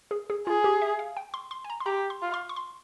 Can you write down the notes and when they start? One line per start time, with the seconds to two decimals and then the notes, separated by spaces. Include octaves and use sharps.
0.11 G#4
0.30 G#4
0.47 F4 G#4
0.64 G4
0.82 E5
0.99 F5
1.17 G5
1.34 C6
1.51 C6
1.65 G#5
1.70 A#5
1.80 C6
1.86 G4 A#5
2.10 C6
2.22 F4
2.34 C6
2.49 C#6
2.56 C6